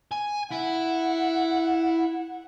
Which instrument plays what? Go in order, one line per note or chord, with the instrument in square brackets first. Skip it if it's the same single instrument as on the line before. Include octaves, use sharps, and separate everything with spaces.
[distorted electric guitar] G#5
[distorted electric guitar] E4 [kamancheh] F#5